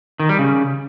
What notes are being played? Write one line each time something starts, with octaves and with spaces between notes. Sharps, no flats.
D#3
G3
C#3